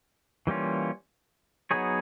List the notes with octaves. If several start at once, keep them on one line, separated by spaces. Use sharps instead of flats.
E3 G3 A#3 C#4 F4
F#3 B3 D#4 G#4 C#5